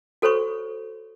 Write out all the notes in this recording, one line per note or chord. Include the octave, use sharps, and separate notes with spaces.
F#4 A4 C5 C#5 B5 C#6